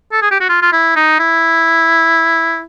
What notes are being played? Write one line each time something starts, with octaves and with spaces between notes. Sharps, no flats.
A4
G#4
G4
F#4
F4
F4
E4
D#4
E4